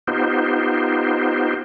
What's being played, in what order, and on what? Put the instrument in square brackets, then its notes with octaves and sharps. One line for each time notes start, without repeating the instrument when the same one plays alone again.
[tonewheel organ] B3 D#4 F4 G4 C5